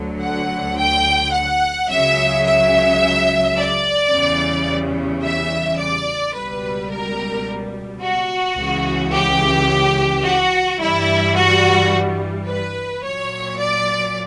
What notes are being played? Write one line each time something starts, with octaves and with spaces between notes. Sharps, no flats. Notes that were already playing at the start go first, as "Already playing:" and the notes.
Already playing: D2 D3 F#3
F#5
G5
F#5
C#2 C#3 F#3 E5
E5
D5
E2 C#3 E3 G3
E5
D5
C#2 B2 G3 B4
A#4
F#4
C#2 C#3 E3
G4
F#4
G2 E3 G3 E4
F#4
B4
A#2 F#3 C#5
D5